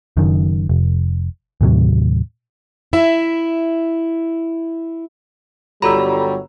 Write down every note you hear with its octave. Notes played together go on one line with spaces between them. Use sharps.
F#1 F#2 D#3
F1
D#2 A2 C3 F#3
E4 E5
G1 F#3 G3 F4 A4 A#5 B5 E6